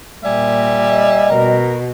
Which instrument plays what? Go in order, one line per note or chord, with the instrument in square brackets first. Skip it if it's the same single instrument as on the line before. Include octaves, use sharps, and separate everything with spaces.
[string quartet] A#2 [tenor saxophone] G3 [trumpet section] E5 G#5
[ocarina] D#5
[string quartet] B2 [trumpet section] A#4